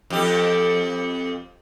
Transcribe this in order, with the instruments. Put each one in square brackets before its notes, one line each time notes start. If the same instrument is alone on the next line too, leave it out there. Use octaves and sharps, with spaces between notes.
[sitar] F2 G4